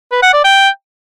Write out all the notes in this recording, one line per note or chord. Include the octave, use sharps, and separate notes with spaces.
B4
F#5
D5
G5